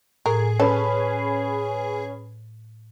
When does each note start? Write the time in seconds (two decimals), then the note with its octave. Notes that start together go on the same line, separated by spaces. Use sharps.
0.26 A2 G#4 A#4
0.60 C#4 A4 B4